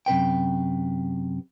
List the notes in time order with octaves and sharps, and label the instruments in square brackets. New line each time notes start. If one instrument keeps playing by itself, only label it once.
[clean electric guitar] F#2 C3 B4 G5